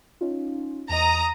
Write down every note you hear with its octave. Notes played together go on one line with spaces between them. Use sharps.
C#4 D#4 F4
E2 D#5 A#5 D#6